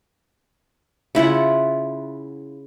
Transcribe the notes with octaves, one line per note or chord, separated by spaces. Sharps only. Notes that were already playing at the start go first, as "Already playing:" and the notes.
C#3 E4 F4 F#5